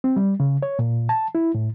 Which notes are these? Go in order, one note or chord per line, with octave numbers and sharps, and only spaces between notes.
C4
G3
C#3
C#5
A#2
A5
E4
A2